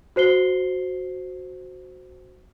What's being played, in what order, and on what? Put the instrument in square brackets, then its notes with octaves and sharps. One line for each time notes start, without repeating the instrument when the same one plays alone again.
[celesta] F#4 C5 C7 G7